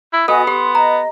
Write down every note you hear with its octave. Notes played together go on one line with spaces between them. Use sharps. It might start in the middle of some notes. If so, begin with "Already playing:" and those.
E4
B3 F#4 A4 D#5 G#5
G4 C6
D#5 A#5